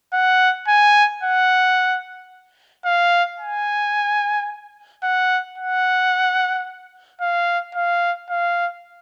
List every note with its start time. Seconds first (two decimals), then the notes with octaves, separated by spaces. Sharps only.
0.13 F#5
0.68 G#5
1.23 F#5
2.85 F5
3.40 G#5
5.03 F#5
5.58 F#5
7.21 F5
7.75 F5
8.30 F5